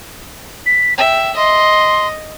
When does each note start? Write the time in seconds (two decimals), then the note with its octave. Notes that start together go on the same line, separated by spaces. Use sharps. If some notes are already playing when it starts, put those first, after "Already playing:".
0.66 B6
0.98 E5 G5
1.36 D#5 C6